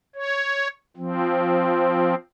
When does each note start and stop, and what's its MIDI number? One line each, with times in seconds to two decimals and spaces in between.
0.15 0.67 73
0.97 2.15 53
0.97 2.15 60